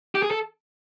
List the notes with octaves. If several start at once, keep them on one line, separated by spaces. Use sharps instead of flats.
G4
G#4
A4